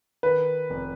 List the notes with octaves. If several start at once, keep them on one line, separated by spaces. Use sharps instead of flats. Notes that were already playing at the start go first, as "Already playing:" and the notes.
D#3 B4
F1